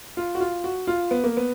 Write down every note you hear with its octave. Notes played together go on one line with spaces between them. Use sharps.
F4
F#4
F4
F#4
F4
B3
A#3
B3